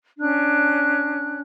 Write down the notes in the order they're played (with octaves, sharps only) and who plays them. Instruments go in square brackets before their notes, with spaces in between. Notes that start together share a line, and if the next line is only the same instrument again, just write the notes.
[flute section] C#4 D4 F#6